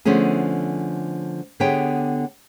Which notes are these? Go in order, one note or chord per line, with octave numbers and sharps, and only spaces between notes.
D3 F3 A3 B3 C#4 G#4
D3 B3 G4 G#4 C#5 G5